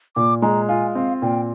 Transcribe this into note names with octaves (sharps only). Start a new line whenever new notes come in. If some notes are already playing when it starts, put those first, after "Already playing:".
A#2 D6
G#3 A#5
F4 G#5
C4 F5
A#2 G5